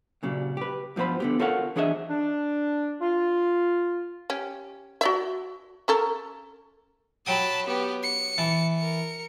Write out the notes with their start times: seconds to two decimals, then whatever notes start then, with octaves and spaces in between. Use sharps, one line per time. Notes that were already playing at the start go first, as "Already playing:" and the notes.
0.23 A#2 C#3 F#3 G3
0.57 G4 B4
0.96 G2 F3 B3 C4 C5 B5
1.20 D3 B3 G4
1.40 F4 A4 A#4 C#5 F5 F#5
1.76 E3 D4 G#4 C#5 D#5 E5
2.09 D4
3.01 F4
4.30 C#4 G4
5.01 F#4 D5 E5
5.88 C#4 A4 A#4
7.26 F#3 G5 A5 B5 D#6
7.66 B3 G4
8.03 C#7
8.38 E3 A5
8.76 A#4 C#7